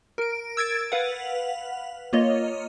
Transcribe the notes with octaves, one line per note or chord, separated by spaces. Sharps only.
A#4 D7
E6 G#6 A6 D7
B4 F5 F#5
A#3 F4 C#5 D#5